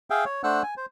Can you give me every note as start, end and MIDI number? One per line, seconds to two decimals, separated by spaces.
0.10 0.25 68
0.10 0.25 76
0.10 0.25 77
0.10 0.25 79
0.25 0.42 73
0.44 0.63 57
0.44 0.63 62
0.44 0.63 72
0.44 0.63 78
0.44 0.63 88
0.44 0.63 90
0.63 0.74 80
0.77 0.86 72